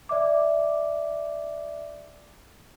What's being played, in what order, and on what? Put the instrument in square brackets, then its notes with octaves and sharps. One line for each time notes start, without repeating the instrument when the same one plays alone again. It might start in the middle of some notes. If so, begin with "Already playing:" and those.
[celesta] D5 E5 D6